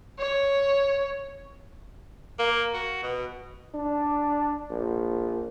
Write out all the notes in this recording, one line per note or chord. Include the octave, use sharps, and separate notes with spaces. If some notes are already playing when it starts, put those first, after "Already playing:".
C#5
A#3
F#4
B2
D4
A#1